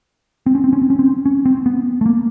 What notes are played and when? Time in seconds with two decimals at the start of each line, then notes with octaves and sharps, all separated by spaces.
0.46 C4
0.55 C#4
0.64 C4
0.73 C#4
0.82 C4
0.90 C#4
0.99 C4
1.26 C#4
1.45 C4
1.66 B3
2.01 A3
2.06 A#3